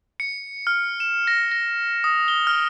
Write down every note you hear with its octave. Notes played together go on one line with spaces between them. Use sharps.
C#7
F6
E7
A#6
A#6
D#6
G7
F6